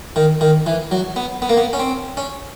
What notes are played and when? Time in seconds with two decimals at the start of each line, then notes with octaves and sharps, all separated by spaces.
0.16 D#3
0.41 D#3
0.66 E3
0.91 F#3
1.16 B3
1.42 B3
1.49 A#3
1.57 B3
1.73 C#4
1.79 C4
2.17 C#4